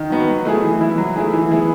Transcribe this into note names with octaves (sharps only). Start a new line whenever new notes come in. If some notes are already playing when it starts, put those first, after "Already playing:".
Already playing: D#3
F#3 B3 F#4
F#3
A3 E4 G#4
E3
B3 E4
F#3
A3 E4 G#4
E3
B3 E4 G#4